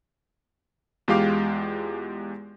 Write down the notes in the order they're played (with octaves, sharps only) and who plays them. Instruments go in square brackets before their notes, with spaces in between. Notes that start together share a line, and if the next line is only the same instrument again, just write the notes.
[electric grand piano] E2 G#3 F4 G4 F5 D6